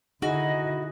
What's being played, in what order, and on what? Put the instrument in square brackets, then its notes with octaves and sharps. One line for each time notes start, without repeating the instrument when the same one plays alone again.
[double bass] D3 E4 [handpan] D#4 G#4 [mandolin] F#4 [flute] D#5